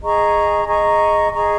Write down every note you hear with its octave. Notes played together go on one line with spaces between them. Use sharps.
G#4 D#5 A#5 C#6
G#4 D#5 A#5 C#6
G#4 D#5 A#5 C#6